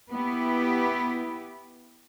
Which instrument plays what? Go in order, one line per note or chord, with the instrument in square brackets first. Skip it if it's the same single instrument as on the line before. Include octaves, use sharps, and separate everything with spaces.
[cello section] B3 E4 G4